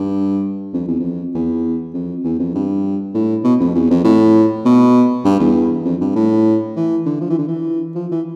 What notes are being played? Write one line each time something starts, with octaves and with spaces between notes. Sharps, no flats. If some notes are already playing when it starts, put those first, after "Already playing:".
Already playing: G2
F2
E2
F2
E2
F2
E2
F2
G2
A2
B2
F2
E2
F2
A2
B2
G2
E2
F2
G2
A2
E3
D3
F3
E3
D3
E3
F3
E3